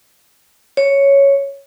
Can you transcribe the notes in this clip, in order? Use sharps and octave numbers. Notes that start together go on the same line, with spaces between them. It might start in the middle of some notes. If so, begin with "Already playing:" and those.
C#5